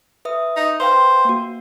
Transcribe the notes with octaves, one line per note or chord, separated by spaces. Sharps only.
B4 E5 D#6
D#4
B4 C5 F5 G5
A#3 F#4